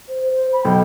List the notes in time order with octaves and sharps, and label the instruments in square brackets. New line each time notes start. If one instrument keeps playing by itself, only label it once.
[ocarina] C5
C5
B5
[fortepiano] B1 [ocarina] G5